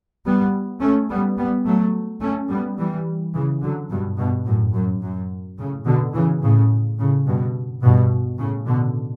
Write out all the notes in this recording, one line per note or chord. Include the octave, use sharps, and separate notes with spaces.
G3 B3
A3 C#4
G3 B3
G3 B3
F#3 A3
A3 C#4
G3 B3
E3 G3
C#3 E3
D3 F#3
G2 B2
G2 B2
F#2 A2
F#2
F#2
A2 C#3
B2 D3
C#3 E3
A2 C#3
A2 C#3
G2 B2
G2 B2
A2 C#3
B2 D3